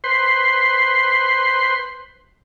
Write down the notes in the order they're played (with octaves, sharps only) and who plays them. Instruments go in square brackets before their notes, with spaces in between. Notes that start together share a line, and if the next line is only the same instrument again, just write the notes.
[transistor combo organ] B4 C5 C6